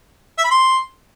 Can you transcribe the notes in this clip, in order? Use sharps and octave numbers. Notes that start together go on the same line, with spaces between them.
E5
B5
C6